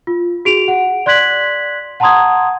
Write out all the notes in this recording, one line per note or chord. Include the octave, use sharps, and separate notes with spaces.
F4
F#4 G#4 D7 F7
F#5
D5 C6 F#6 G#6 B6 F#7
F#5 A5 A#5 C6 D#6 G#6